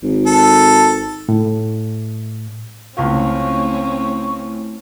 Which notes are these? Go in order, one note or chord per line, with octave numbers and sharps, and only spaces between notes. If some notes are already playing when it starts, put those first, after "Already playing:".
G#1
A4
A2
C#2 A3 C4 C#4 E4 F4 F5 C#6